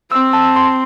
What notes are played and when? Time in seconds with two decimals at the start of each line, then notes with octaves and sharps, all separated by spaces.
0.12 C4 E6
0.33 A5
0.56 C6